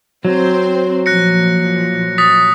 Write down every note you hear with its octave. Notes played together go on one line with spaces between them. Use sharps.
F#3 C4 C5
A#2 F3 F#6 A#6 C#7
D#6 A6 B6